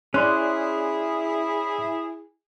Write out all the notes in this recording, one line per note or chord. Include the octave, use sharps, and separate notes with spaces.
C#4 E4 G#4 D5 C6 F#6